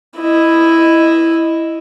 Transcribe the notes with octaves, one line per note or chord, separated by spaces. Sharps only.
E4 D#5